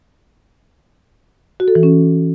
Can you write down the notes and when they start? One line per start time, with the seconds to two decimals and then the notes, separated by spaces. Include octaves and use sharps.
1.60 F#4
1.68 A4
1.75 E3
1.83 C#4